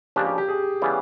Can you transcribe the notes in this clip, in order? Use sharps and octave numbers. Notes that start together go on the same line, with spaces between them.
C#3 F3 A#3 D4 G4
G4
G4
G#4
C#3 E3 G3 B3